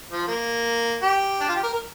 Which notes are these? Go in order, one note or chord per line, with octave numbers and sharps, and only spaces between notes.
F3
A#3
G4
D4
F4
G4
A#4
A#4